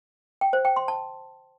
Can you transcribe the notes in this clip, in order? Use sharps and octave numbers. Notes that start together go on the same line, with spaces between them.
G5
C5
G5
C6
A5